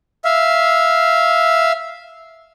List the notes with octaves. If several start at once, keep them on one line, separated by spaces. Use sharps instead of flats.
E5 F5